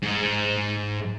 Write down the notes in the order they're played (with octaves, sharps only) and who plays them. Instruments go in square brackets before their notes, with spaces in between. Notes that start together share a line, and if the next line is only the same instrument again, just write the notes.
[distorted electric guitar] G#2